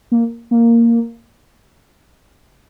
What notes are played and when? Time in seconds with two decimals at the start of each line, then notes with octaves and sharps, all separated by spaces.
0.12 A#3
0.51 A#3